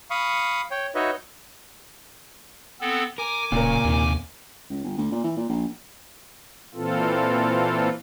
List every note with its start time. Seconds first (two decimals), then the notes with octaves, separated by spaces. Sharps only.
0.10 F5 B5 C#6 D#6
0.71 C#5 G5
0.95 D#4 F#4 B4 C#5 D#5 E5
2.81 B3 C4 A4
3.18 A#4 G#5 D6
3.52 D1 A#2 C#3 A#4
3.85 D#2 C3 D#3
4.70 C#2
4.84 G1
4.98 D2
5.12 A#2
5.24 E3
5.37 A#2
5.49 A#1
6.75 A#2 E3 C4 F4 A4